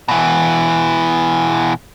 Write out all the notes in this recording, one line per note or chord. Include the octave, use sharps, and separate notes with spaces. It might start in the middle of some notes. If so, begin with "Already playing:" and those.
B2 E3